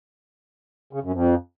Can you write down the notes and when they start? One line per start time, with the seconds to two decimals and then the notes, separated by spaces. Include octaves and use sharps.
0.93 C#3
1.03 F#2
1.13 F2